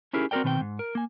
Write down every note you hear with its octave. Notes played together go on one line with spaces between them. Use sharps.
C#4 D#4 E4 G4 G#4 A#4
C4 F#4 A4 A#4 D5 G5
B2 D#3 C4 A#4 G5
G#2
A#4
A#3 G#5